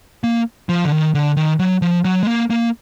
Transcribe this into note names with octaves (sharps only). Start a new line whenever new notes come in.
A#3
F3
D3
D#3
D3
D#3
F#3
F3
F#3
G#3
A#3
A#3